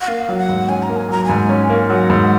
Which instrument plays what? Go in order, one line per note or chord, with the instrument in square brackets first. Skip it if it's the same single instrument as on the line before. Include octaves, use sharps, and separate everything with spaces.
[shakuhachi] F#5
[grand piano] A#3 [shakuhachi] F5
[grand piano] F#3
[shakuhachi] F#5
[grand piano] G#2
[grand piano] C#4 [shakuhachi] G#5
[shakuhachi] A#5
[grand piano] A#3
[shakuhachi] G#5
[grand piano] F#3 [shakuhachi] A#5
[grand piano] G#2 [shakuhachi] G#5
[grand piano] C#4
A#3
[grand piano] F#3 [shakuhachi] F#5
[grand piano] G#2